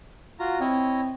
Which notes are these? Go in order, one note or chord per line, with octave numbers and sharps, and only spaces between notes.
F4 F#4 A#5
C4 E4 C#5 D#5